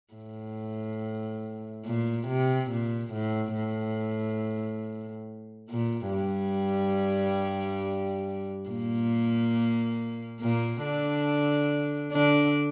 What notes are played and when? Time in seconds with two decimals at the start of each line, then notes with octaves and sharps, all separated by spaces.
0.14 A2
1.85 A#2
2.28 C3
2.71 A#2
3.13 A2
3.56 A2
5.70 A#2
6.13 G2 G3
8.70 A#2 A#3
10.40 A#2 A#3
10.83 D3 D4
12.12 D3 D4